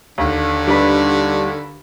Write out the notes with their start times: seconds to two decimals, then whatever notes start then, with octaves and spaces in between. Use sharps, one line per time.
0.18 D#2 D3
0.67 G3 D4 D#4 B4 B5